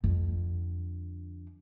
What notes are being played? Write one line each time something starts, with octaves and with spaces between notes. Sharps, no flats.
F2 D3